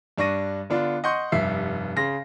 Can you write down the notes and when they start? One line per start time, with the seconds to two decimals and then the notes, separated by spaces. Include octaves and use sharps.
0.18 G2 D4 C#6 A#6 D#7
0.70 D3 B3 D4 F4
1.04 D#5 F#5 C6 C#6 G6
1.32 F1 G2 E5 C7
1.96 C#3 C6 A#6